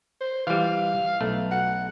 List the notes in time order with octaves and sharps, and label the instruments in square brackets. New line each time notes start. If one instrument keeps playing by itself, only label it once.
[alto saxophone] C5
[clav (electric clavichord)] E3 G3 [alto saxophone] F5
[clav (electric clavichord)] B1 A3
[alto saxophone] F#5